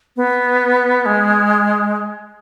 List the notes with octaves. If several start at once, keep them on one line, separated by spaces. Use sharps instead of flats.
B3
G#3